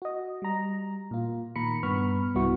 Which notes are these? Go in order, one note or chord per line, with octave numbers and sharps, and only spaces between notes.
F#4 D#5
G3 A#5
A#2 F4
A#2 D#3 A#5 B5 C#7
G2 B3 B5 C#6 F6
C2 G2 B3 E4 F#4 C#6